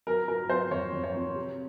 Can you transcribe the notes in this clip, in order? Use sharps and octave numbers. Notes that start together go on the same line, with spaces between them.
F#3 A#4
F#3 A#4
F#3 C5
F2 C#5
F2
C#5
F2
C3